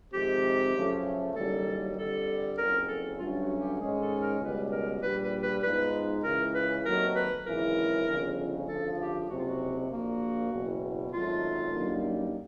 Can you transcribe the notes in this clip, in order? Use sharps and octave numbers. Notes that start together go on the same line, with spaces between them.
F2 C3 D#3 G#3 C4 G4
F#2 C#3 F3 A3 C#4
F#1 F#2 D#3 G3 A4
F2 D3 G3 A4
F#1 F2 C#3 A#4
A4
G2 D3 F#3 A3 C#4 F4
F#4
G4
G#2 D#3 G#3 C#4 G#4
A4
A#4
C#2 B2 G3 B4
A#4
A#1 A#2 G3 B4
B4
B4
G#2 F3 G#3 B3 D#4 B4
C#2 C#3 E3 A#4
B4
D#2 D#3 F#3 A3 C4 A#4
B4
G#1 F#2 C#3 E3 A#4
G1 F2 C#3 F3
D2 C#3 F3 A4
G4
F#1 F2 C3 F#4
F4
F#4
A#1 A#2 F3 A#3 F#4
F#1 E2 B2
G#1 F#2 D#3 F#3 A3 F4
F#2 D3 G3 A#3 D#4